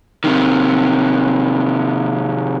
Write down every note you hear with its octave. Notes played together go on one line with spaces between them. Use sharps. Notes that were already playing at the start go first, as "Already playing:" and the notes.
C3 D#3